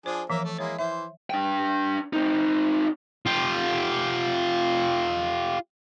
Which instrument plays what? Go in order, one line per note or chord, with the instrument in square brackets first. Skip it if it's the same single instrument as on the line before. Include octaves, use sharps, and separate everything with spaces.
[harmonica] F3 D4 G#4 [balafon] C5
[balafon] E3 F3 [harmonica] A#3 A#4 E5
[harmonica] A3
[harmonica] G#3 A#3 E4 [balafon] C#5
[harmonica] E3 C5 [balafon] E5
[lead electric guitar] D4 G5
C4 D#4
[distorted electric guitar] F4 G4